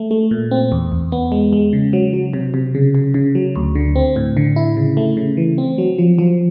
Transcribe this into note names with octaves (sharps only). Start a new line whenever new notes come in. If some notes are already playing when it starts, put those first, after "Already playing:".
Already playing: A3
A3
A#2
C4
E2
E2
B3
G#3
G#3
C#3
F#3
F#3
C3
C3
C#3
C#3
C#3
F#3
D2
D3
C4
A2
D3
E4
C#3
A3
C#3
E3
C4
F#3
F3
F3